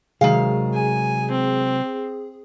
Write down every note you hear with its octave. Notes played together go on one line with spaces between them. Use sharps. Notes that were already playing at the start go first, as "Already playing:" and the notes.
C3 D#3 F#3 G#3 G#4 F5
G#5
C4